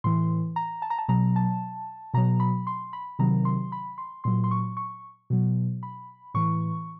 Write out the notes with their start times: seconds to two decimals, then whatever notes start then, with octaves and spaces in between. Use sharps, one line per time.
0.04 A2 E3 C6
0.56 A#5
0.82 A5
0.90 A#5
0.98 A5
1.08 B2 F#3 A#5
1.36 A5
2.14 B2 F#3 A#5
2.40 B5
2.67 C6
2.93 B5
3.19 C3 D#3 F#3 A#5
3.45 C6
3.72 B5
3.98 C6
4.24 A#2 F#3 C6
4.44 C6
4.51 C#6
4.77 C#6
5.30 B2 F#3
5.83 B5
6.34 A2 E3 C#6